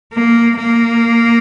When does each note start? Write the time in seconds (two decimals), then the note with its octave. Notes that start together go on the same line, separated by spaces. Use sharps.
0.14 A#3
0.57 A#3